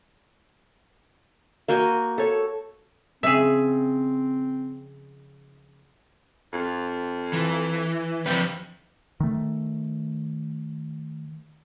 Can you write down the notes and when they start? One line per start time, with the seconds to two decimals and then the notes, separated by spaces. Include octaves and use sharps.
1.68 A#3 F#4 G5 G#5
2.18 A4 C#5
3.23 C#3 F3 C4 C#4 G#4 E5
6.53 F2
7.33 E3
8.26 F3 G3 C4 B4
9.20 D#3 A3